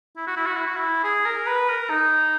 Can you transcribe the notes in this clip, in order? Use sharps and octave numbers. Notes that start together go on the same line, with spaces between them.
E4
F#4
E4
F#4
E4
F#4
E4
G#4
A#4
B4
A#4
D#4